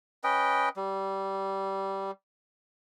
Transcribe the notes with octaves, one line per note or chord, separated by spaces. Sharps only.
C#4 B4 D#5 G5
G3